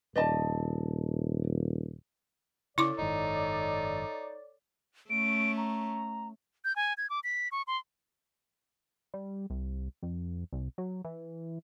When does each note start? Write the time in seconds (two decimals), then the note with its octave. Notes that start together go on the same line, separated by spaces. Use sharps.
0.16 D#1 D5 D#5 A5
2.78 C#3 E4 A4 C#5 D5 C6 D6
2.98 F#1 G#2 D#3 D#4
5.10 A3 C#4 D7
5.57 A#5
6.65 G6
6.76 G#5
6.98 G#6
7.10 D6
7.24 B6
7.52 C#6
7.67 C6
9.14 G3
9.50 C2
10.03 F2
10.53 C2
10.78 F#3
11.05 E3